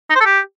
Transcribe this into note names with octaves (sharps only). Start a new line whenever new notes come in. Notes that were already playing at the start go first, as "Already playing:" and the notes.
D#4
C5
A4
G4